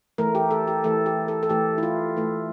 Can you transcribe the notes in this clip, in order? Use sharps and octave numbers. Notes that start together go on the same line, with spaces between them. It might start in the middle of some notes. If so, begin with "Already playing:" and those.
E3 A3 A#4
G4
A4
G4
E3 A3 A4
G4
A4
A4
E3 A3 G4
E4
F4
E3 A3